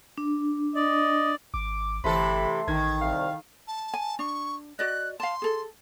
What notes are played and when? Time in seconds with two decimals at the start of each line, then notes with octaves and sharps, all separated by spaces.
0.18 D4
0.76 D5 D#5
1.54 G#1 D6
2.04 G1 C3 E3 A3 A4 B5 C6
2.68 A1 D#3 G#6
3.01 C2 F5
3.68 A5
3.94 G#5
4.19 D4 C#6
4.79 F#4 D5 D#5 F#6
5.20 F5 A5 C6
5.42 G#4 A4